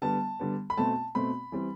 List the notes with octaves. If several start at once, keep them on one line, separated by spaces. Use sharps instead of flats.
D3 G3 B3 A5
D3 G3 B3
B5
B2 A3 C4 A5
B2 A3 C4 B5
E3 G3 C4